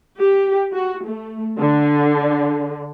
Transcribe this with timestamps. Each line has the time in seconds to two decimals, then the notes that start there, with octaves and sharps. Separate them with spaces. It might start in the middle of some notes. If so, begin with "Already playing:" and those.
0.19 G4
0.73 F#4
1.07 A3
1.58 D3